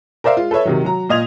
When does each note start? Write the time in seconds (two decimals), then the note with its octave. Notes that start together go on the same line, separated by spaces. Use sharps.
0.24 A#4 C5 D5 E5 F5
0.37 G#3 F4
0.51 A4 B4 C#5 E5
0.65 C3 D#3 F#3
0.85 F#3 A#5
1.09 A#2 F4 D#5 D#6 G#6 F7